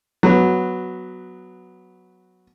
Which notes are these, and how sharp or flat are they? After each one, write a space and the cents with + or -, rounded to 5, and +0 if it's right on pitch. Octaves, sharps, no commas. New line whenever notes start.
F#3 -5 B3 +0